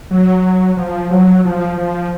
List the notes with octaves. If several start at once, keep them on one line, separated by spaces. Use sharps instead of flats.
F#3
F3
F#3
F3
F3